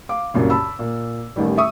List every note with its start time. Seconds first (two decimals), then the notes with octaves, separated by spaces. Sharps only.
0.09 F5 D6
0.34 C2 F#2 A#2 C#3
0.50 A5 B5 E6
0.79 A#2
1.36 A1 A2 D#3 G3
1.57 E5 C#6 D#6 E6